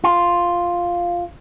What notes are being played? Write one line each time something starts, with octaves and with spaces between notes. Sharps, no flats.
F4